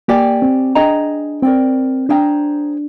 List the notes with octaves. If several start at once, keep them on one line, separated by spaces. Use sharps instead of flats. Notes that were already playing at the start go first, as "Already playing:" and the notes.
A#3 G4 D5 G#5
C4
D4 G#4 D#5 G5 A#5
C4 A#4 D5 G5
D4 G#4 C5 G5 A#5